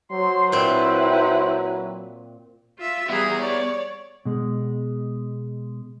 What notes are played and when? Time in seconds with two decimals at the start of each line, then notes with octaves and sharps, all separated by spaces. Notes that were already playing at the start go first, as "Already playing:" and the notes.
0.12 F#3 C5 C6
0.52 A#2 C4 E4 B4
2.78 F4 E5
3.09 G3 B3 G#4 E5 A#5
3.41 C#5 D5
4.25 B2 G#3